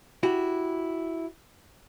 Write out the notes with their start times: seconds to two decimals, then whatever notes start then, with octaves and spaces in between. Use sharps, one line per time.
0.23 E4 F#4 G4